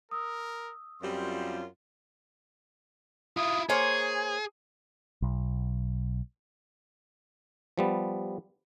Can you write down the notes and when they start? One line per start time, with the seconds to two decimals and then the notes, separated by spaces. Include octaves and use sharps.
0.11 A#4 D#6 E6
1.02 F#2 G3 C4 F4 C6
3.37 E4 F4 D#6
3.69 A#3 G#4 C5 C#5 G#5
5.22 B1
7.78 F3 G3 B3